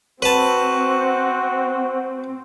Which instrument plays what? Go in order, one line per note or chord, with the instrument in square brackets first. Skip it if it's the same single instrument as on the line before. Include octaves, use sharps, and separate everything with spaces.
[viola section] C4 [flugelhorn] F#4 [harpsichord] B4 A5